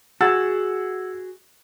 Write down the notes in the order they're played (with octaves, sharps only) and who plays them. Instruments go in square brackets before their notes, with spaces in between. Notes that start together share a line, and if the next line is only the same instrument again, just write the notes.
[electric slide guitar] F#4 G#4 [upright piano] F#5 E6 A6